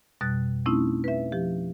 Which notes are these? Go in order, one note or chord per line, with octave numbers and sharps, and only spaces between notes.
F2 B2 G3 F#6 A6
A3 C4 C#4 D#4 E4
B4 E5
F3 G4